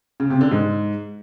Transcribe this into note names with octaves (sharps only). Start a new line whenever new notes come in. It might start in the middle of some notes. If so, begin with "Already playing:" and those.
C#3
C3
D3
G#2